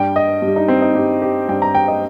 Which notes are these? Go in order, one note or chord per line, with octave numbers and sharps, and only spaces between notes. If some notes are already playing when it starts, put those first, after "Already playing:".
Already playing: G2 G3 G5
D#5
G2
G3
D#4
C4
D#4
G2 G3 G4
G4
G2 G3 G5
A#5
G5
D#5